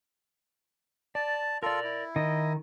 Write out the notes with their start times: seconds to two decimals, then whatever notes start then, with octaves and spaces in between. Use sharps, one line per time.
1.15 D5 A5
1.63 F4 A4 A#4 D5
1.84 E4
2.16 D#3 D#5